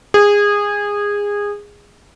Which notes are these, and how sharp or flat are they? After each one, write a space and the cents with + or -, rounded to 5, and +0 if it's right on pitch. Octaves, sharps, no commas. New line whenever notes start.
G#4 -20